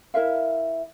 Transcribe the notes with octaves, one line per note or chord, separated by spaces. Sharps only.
E4 A#4 E5 F5